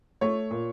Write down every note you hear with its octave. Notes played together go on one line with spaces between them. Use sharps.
A3 C#5
A#2